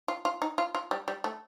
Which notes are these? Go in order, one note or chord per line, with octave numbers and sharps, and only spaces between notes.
F4
F4
D#4
F4
F4
G3
G3
A3